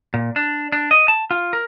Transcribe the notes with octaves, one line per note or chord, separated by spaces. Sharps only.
A#2
D4
D4
D#5
A5
F4
A#4